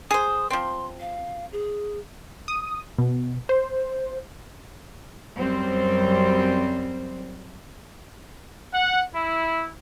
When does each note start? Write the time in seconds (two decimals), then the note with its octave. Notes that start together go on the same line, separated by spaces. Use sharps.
0.11 G#4 C5 D#6
0.50 F3 C4 C6
1.00 F5
1.52 G#4
2.48 D#6
2.98 B2
3.49 C5
5.37 F#2 G3 C4
8.74 F#5
9.14 E4